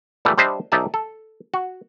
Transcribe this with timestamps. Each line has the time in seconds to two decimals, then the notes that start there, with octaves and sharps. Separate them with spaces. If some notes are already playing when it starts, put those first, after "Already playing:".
0.25 A#2 E3 G3 A3
0.38 G3 D4 C5 D#5 E5
0.72 B1 D#4 D5 E5 G#5 A5
0.94 A4
1.54 F#4